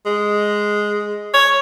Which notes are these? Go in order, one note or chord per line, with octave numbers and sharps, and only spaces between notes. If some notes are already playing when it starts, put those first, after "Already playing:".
G#3
C#5